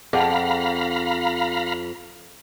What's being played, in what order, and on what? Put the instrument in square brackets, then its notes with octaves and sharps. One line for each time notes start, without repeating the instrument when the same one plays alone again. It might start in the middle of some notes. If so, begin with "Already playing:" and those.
[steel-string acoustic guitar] F2 [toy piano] G#4 F#5 [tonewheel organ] F5 A#5 B5